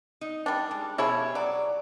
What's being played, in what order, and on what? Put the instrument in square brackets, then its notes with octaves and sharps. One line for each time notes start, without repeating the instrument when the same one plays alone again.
[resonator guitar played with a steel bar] D#4
[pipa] G3 D4
[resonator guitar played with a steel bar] G#3
[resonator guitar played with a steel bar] B2 G4 G#4 [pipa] F3 E4 C#5
[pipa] F#3 [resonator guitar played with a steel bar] D5